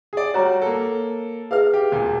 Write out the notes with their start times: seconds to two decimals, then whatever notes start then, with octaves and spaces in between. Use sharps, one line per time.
0.13 G#4 D5
0.34 G3 F#4 C#5 A#5
0.62 A#3 A4
1.51 G#4 B4 E5 F5 F6
1.73 G4
1.92 E1 A#2